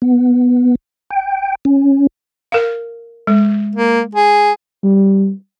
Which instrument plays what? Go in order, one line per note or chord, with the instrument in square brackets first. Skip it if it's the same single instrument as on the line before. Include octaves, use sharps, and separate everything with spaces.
[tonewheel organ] B3
G5
C#4
[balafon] A#4 F5
G#3
[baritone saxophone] A#3
G#4
[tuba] G3